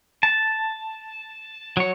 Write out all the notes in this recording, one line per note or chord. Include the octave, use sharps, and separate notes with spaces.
A5
F#3 C#5